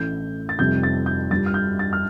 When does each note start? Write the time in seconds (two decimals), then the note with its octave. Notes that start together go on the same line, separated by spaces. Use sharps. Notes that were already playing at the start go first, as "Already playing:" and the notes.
Already playing: A1 A2 A3 G6
0.49 A6
0.59 F1 F2 C3 G3 G6
0.83 A6
1.06 G6
1.31 G2 G3 F4 A6
1.46 F6
1.54 G6
1.79 A6
1.93 F6